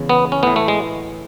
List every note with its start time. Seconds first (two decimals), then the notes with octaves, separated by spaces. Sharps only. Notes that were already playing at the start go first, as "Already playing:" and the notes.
Already playing: E2 C#3
0.09 B3
0.32 C#4
0.43 A2 E3 B3
0.56 A3
0.68 G#3